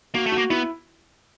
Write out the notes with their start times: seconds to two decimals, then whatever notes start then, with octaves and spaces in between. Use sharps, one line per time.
0.14 A#3 F#4
0.26 A3
0.32 F#4
0.38 A#3
0.50 B3 E4